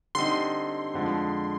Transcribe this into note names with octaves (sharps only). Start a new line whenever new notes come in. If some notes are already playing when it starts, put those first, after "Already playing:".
D3 G3 C4 D#4 C6
F2 D3 F3 G#3